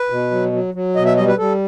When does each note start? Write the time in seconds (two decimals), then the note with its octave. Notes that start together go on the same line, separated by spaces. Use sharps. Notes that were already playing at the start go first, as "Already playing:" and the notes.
Already playing: B4
0.10 B2
0.31 F#3
0.52 F#3
0.74 F#3
0.96 B2 D#5
1.06 E5
1.17 G3 D#5
1.28 B4
1.38 G3 A4